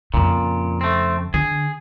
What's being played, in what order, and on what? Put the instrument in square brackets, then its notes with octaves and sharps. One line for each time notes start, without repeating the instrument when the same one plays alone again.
[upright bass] F2 C#3 [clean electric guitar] A#2
[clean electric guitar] A3 C4
[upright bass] D3 [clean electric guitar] G#4